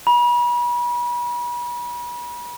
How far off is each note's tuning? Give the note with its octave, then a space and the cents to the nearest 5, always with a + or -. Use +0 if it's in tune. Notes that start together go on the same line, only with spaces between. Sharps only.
B5 -40